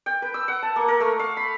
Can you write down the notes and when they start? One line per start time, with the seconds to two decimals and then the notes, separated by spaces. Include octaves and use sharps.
0.06 G5
0.22 B4
0.34 E6
0.48 F#5
0.62 A5
0.76 A#3
0.88 A#4
1.00 A3
1.19 F5
1.37 B5